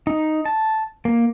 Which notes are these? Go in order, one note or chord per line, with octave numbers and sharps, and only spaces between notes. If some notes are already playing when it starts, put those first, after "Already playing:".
D#4
A5
A#3